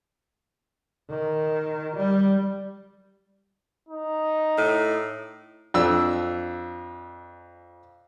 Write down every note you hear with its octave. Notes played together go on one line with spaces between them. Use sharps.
D#3
G3
D#4
A2
F2 D4 E6